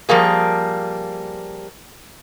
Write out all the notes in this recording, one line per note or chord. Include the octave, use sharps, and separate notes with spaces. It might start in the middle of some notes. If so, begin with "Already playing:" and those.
F3 G3 A#3 G#4